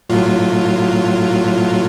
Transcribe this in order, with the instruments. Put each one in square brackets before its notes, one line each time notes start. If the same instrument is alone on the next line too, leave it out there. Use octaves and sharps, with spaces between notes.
[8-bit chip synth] A2 F#3 F4